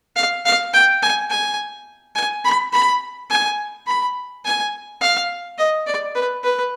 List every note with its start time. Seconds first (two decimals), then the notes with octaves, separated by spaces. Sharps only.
0.16 F5
0.45 F5
0.73 G5
1.02 G#5
1.30 G#5
2.15 G#5
2.44 B5
2.73 B5
3.30 G#5
3.87 B5
4.45 G#5
5.01 F5
5.58 D#5
5.86 D5
6.15 B4
6.43 B4